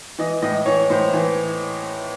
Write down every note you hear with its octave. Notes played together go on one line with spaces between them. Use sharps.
E3 D#5
A2 D#5
E3 C#5
A2 C5
E3